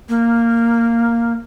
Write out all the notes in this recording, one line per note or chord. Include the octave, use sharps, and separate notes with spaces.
A#3